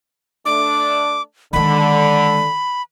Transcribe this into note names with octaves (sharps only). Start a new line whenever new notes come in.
A3 D4 D6
D3 D#3 G#3 B5